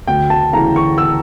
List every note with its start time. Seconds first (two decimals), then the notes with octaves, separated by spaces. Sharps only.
0.07 D2 G5
0.30 A5
0.52 C#3 E3 A3 A#5
0.76 C#6
0.98 E6